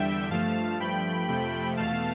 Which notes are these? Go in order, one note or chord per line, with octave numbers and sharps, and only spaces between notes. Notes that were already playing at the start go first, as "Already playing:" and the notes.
Already playing: E2 D3 G3 E5 G5
G2 F3 A3 F5 A5
G2 F3 A3 G5 B5
F2 C3 F3 A3
E2 B2 A3 F5 A5